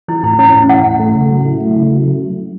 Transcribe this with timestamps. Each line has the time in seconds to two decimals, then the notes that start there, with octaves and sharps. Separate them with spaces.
0.08 E3 E4
0.23 A2 E4
0.39 C#4 E4
0.54 A2
0.69 E3 F#5
0.84 A2
0.99 A3
1.14 C#3
1.30 F#3
1.45 E4
1.61 A3
1.76 C#3
1.91 F#3